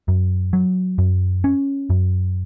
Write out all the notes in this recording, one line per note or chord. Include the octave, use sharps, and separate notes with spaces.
F#2
F#3
F#2
C#4
F#2